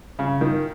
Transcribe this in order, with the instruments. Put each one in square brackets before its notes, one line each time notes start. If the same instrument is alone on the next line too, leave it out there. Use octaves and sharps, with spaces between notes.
[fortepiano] C#3
D#3